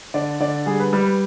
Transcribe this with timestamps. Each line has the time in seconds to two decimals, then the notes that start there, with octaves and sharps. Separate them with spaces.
0.14 D3 D5
0.40 D3 D5
0.66 G3 G#4
0.80 B4
0.93 G3 B4
1.05 B4